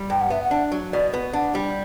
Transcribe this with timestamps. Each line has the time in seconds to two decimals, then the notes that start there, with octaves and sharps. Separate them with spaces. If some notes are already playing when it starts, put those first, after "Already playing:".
Already playing: G3
0.10 G2 G5
0.21 F#5
0.30 B3 E5
0.43 F#5
0.51 D4
0.72 F#3
0.93 B2 D5
1.14 B3
1.33 D4 F#5
1.55 G3